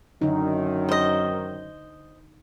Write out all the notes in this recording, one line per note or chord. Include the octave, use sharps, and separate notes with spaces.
F#2 D3 D#3 D#4
C5 D#5